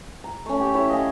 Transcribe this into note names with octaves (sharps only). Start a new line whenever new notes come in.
A#5
A3 C#4
G4
E4 A4 C#5
D#5 F5 G#5